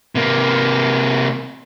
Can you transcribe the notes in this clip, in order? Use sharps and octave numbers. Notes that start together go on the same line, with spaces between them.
C3 A#3